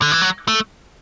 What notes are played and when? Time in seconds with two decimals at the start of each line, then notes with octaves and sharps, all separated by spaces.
0.02 D3
0.12 E3
0.21 F#3
0.48 A3